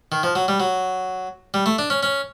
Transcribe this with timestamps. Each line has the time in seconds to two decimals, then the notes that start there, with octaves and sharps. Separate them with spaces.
0.12 D#3
0.23 F3
0.35 F#3
0.48 G3
0.60 F#3
1.54 G3
1.66 A3
1.79 D4
1.90 C#4
2.03 C#4